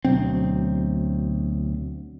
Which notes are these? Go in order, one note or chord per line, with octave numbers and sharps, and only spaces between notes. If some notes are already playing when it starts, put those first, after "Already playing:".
D2 B2 F#3 C4